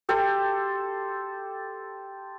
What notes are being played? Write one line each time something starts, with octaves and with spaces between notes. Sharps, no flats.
G4 A4 C5